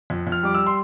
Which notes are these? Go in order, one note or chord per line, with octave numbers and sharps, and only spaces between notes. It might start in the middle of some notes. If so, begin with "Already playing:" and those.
F2
F2
F6
G3 D6
E6
C6